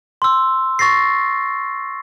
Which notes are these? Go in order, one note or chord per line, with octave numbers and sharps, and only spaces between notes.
C6 E6
C#6 A6 A#6 C7